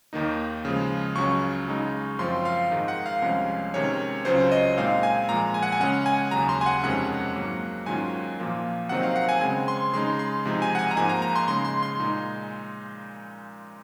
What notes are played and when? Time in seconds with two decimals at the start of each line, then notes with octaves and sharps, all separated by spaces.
0.13 D#2 D#3 A#3 D#4
0.65 C#3 F3 G#3
1.15 C#2 C#3 F#3 C#4 C#6
1.67 C#3 G#3 D#4
2.19 F#2 F3 C4 F4 C6
2.45 F5
2.71 G#2 D#3 G#3 D#4
2.88 F#5
3.06 F5
3.22 C2 C3 F3 G#3 C#4
3.74 C3 D#3 G#3 C#4 C#5
4.25 C#2 C#3 F#3 C#4 F4 C5
4.52 D#5
4.77 A#2 G#3 C4 D#4 F5
5.03 G#5
5.29 A#2 F3 G#3 A#5
5.54 G#5
5.63 F#5
5.72 G#5
5.80 C#3 G#3 C#4 F#5
6.06 G#5
6.31 D#2 C#3 F#3 A#5
6.49 C6
6.61 G#5
6.66 F#5
6.83 F2 C3 D#3 G#3 C#4 F#5
7.35 G#2 F#3 A#3
7.86 G#2 D#3 F#3 C#4 F4 G#5
8.39 A#2 F3 A#3 F4
8.89 C3 D#3 F#3 C4 D#4 F#5
9.03 F5
9.16 F#5
9.29 G#5
9.41 C#3 G#3 C4 G#5
9.68 C6
9.93 C#3 G#3 D#4 C6
10.19 C6
10.45 C3 F3 G#3 D#4
10.62 G#5
10.75 F#5
10.79 G#5
10.91 A#5
10.96 G#2 F3 A#3 D#4 G#5
11.09 A#5
11.22 A#5
11.36 C6
11.48 C#3 G#3 D#4 C6
11.65 C6
11.83 C6
11.99 A#2 G#3 D#4